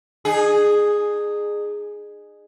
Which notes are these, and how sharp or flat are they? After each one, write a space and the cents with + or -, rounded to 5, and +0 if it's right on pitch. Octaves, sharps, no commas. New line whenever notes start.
D#4 -40 G#4 +0